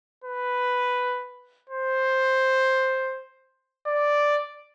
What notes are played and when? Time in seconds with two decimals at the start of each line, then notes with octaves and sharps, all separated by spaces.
0.24 B4
1.69 C5
3.87 D5